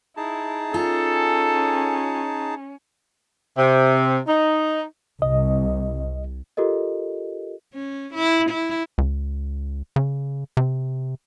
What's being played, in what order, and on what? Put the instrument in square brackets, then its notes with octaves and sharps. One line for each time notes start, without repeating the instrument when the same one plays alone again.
[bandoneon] D#4 G#4 A5 [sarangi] E4
[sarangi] C#4 [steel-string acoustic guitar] F4 [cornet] A4
[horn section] C3
D#4
[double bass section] C2 [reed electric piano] D#5
[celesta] F4 G4 A4 A#4 D#5
[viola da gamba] C#4
E4
E4
[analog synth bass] C#2
C#3
C3